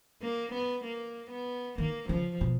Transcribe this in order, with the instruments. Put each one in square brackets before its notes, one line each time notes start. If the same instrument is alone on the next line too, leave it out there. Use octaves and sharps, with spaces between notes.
[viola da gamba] A#3
B3
A#3
B3
[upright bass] D#3 [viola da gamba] A#3
[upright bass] C#3 [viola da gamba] F3
[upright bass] B2